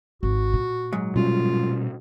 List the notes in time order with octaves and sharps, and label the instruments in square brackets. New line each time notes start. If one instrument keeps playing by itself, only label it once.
[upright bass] G#1 [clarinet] F#4
[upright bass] A#2
[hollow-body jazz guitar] G#2 F#3
[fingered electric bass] B2 G3 C#4 [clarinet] F4